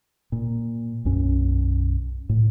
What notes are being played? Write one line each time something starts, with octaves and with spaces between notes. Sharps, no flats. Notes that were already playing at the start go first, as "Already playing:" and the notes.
A#2
B1 F#2 C#4
A2